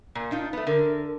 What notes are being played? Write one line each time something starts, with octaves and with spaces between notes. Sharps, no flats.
A#2
D4 D#4 F4
A3 B3
D3 A#4